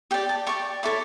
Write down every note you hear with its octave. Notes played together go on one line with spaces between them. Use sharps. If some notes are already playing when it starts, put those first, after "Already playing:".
G4 D5 G5
A5
G4 D5 C#6
E4 A4 C#5 D6